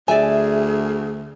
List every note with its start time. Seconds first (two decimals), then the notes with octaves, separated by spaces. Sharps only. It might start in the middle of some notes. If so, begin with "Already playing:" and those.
0.08 D2 G#4 D5 E5 G#5